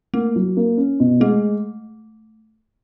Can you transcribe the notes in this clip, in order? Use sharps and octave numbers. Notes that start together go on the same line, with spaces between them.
A3 A#3
F#3
A#3
C#4
B2
G#3 A3